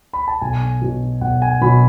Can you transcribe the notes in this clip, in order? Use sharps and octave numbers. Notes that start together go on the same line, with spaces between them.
B5
A5
B1 G#5
B2 F#3
B1 F#5
G#5
B2 F#3 B5